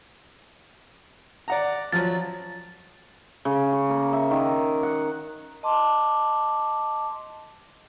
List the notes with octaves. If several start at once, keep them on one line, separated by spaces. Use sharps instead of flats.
D5 F#5 A#5
F3 F#3 A6
C#3
C#6
A#3
E5
D#3
F#5
D#5 A5 C6 D6